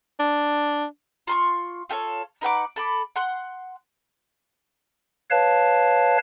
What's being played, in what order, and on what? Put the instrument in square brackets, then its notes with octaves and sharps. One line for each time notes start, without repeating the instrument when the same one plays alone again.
[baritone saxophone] D4
[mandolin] F4 C6 C#6
F4 G4 A4 C#5
D#4 B4 F#5 D6
A4 B5 D6
F#5 C6 F#6
[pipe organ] B4 C#5 F5 A5